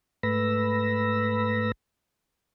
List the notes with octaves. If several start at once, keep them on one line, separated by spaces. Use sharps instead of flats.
G#2 A3 B4 B5 E6 A#6